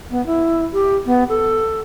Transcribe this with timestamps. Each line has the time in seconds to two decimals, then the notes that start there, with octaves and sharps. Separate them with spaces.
0.11 B3
0.26 E4
0.73 G4
1.06 B3
1.29 A4